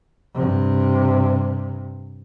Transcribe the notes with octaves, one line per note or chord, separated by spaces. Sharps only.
G2 C3